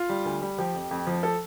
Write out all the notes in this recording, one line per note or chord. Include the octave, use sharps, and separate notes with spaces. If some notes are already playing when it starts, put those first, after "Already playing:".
Already playing: F4
G3
D2
G3
F3 G4
F2
F2
F3
A4